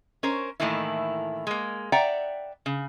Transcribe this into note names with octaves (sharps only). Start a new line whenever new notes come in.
C#4 A#4 C5
A2 D#3 E3 A3 A#3 E4
G#3 A#3
D5 E5 F#5 G5 A#5
C#3